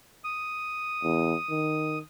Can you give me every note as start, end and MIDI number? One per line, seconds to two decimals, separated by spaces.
0.24 1.99 87
1.03 1.34 40
1.50 2.00 51